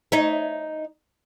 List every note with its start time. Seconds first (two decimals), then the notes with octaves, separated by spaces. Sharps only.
0.12 D#4 C#5 E5